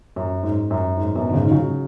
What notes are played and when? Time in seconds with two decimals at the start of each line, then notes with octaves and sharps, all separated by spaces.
0.16 F#2
0.43 G#2
0.71 F#2
0.97 G#2
1.15 F#2 B2
1.30 D#3
1.33 G#2 C#3
1.47 D#3
1.51 C#3 F#3